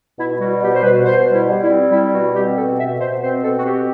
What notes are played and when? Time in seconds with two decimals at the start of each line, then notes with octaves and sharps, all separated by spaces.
0.18 B2 E4
0.39 G3 F#4
0.61 B2 G4
0.74 C5
0.83 B2 B4
1.05 B2 C5
1.26 G3
1.33 E4
1.49 G3
1.63 E4
1.69 C4
1.91 G3 E4
2.13 B2 F#4
2.34 C4 G4
2.56 B2 A4
2.78 B2 E5
2.99 B2 C5
3.21 C4 C5
3.43 B2 A4
3.58 F#4
3.65 C4 G4